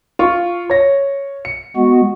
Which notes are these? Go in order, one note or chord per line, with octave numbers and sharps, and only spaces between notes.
F4 C#6
C#5 A#6
C#7
G#3 B3 F#4